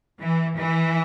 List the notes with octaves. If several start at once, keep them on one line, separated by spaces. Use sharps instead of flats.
E3
E3